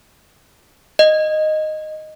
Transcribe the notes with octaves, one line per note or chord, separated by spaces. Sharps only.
D#5